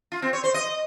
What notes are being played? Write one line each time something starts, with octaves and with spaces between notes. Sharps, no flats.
F4
C4
C#5
C5
D#5